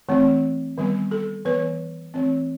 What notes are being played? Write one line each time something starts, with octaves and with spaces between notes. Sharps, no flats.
E3 A3 C4
D#3 G3 B3
A4
E3 B3 B4
E3 A3 C4